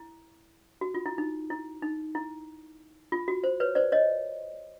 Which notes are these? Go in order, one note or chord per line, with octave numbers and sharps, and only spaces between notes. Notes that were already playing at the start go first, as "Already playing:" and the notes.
Already playing: E4
F#4
F4
E4
D#4
E4
D#4
E4
F4
F#4
C5
B4 C#5
C5 D5
C#5 D#5